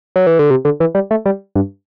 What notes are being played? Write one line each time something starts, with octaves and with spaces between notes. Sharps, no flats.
F#3
E3
D3
C3
D3
E3
G3
A3
G3
G2